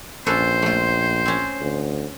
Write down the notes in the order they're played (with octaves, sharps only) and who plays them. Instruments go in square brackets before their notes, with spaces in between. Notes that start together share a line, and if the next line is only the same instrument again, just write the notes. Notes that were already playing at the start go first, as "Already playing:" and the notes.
[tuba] A#1 [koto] C#4 A4 B4 [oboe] C5
[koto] A3 F4
C4 C#4
[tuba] D2